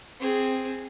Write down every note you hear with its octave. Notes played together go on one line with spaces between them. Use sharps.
C4 G#4